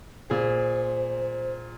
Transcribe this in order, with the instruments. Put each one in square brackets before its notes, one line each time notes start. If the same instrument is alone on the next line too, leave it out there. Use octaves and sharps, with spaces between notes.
[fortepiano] A#2 G#4 [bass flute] C5